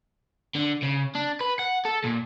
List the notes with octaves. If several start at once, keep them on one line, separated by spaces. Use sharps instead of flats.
D3
C#3
D4
B4
F#5
A4
A#2